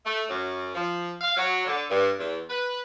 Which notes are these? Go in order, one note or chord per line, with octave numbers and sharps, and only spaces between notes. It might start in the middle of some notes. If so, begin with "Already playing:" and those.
A3
F#2
F3
F5
F#3
D3
G2
E2
B4